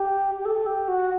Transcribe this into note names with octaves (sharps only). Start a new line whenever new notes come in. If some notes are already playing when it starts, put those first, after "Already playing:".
Already playing: G4
G4
A4
G4
F#4